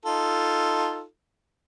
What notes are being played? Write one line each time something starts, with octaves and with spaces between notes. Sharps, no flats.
D#4 F4 A4